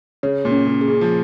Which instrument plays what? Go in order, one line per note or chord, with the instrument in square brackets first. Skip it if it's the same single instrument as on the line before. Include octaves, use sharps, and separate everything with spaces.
[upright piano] C#3 [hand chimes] C#5
[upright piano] A#2
[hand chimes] C#4
[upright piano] C#3
[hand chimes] G#4
[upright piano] C#3
F3